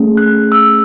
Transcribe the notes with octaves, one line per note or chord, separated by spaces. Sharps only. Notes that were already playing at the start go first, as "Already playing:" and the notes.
Already playing: A3 C#4 G#4
F#6
E6